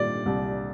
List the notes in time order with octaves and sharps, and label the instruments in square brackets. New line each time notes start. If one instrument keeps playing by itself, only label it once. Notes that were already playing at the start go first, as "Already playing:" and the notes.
Already playing: [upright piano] A#2 G3 D5
C2